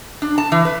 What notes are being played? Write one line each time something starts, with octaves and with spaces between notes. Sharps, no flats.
D4
A5
E3
B4